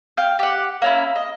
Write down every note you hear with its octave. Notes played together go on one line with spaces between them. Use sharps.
F5 G5
G4 F#5
A#3 C#4 E4
D#5